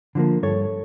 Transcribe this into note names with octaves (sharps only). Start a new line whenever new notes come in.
D3 F3 A#3
G2 A4 C#5